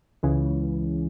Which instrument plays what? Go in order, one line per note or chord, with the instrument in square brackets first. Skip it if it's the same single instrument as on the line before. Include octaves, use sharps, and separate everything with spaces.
[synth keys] C#2 C#3 E3